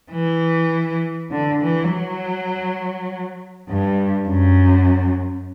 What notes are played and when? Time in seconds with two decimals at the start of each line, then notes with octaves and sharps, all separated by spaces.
0.12 E3
1.31 D3
1.61 E3
1.91 F#3
3.68 G2
4.28 F#2